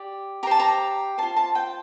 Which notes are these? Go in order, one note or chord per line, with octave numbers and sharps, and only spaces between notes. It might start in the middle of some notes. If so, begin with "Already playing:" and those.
Already playing: G4 D5
G4 C5 A5 A#5
A#5
F4 C5 A5
A5
G5